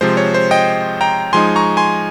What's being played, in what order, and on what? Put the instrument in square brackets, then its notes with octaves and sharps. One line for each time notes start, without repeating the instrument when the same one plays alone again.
[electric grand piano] C3 F3 G#3 C5
C#5
C5
D#5 G5
G5 A#5
F3 G#3 D#4 G#5 C6
A#5 C#6
G#5 C6